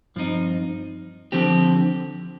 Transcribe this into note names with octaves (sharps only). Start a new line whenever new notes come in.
G2 F3 C4 D#4
D3 F3 C4 G4